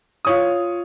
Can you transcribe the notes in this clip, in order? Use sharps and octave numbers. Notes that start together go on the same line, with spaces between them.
F4 C#5 D#6